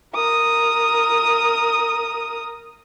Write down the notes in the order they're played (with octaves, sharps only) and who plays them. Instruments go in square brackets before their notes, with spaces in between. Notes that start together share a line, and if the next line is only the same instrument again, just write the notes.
[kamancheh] A#4 D#6